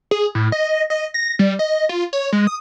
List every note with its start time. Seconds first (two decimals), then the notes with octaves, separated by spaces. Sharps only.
0.11 G#4
0.35 A2
0.52 D#5
0.69 D#5
0.90 D#5
1.14 A#6
1.39 G3
1.59 D#5
1.89 F4
2.13 C#5
2.33 G#3
2.47 D#6